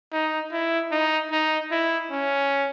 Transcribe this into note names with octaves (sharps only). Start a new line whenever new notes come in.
D#4
E4
D#4
D#4
E4
C#4